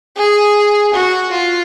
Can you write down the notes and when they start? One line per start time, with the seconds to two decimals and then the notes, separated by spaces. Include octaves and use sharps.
0.17 G#4
0.93 F#4
1.31 F4